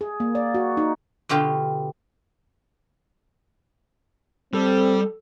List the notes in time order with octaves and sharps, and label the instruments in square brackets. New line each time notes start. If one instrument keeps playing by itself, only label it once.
[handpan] G#4
A#3
D5
F#4
D#4
[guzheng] B2 D3 F4 G4 F5
[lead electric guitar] G3 [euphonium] C4 [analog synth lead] A4